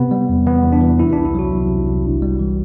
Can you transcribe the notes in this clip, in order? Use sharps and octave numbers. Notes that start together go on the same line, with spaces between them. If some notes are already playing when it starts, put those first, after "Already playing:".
Already playing: C3 B3
G3
E2
E3 B3
E2
D4
E3
C3 E4
C2 D4
E4
F#3 F#4
C2
C3
C2
G1
G3
E3